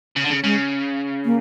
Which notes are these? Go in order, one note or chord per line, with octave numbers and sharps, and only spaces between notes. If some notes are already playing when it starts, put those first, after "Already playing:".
C#3
D3
C#3
C#3 G#3
A#3